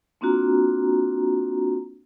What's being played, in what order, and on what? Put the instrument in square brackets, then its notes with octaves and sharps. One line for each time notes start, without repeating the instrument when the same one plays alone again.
[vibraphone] A#3 C4 D4 F4 F#4 A#5